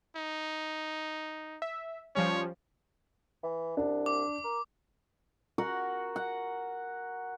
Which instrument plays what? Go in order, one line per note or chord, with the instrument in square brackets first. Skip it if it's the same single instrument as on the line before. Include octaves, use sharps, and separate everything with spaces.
[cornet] D#4
[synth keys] E5
[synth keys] F3 G3 C#4 [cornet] C#5
[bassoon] E3
[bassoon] C2 [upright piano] D4
[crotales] D6
[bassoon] A#4
[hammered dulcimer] F#4 A#4 F#5
F#5